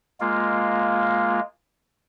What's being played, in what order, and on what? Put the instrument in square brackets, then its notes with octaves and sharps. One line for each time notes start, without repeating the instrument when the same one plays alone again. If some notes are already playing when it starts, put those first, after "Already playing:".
[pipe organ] G#3 A#3 F4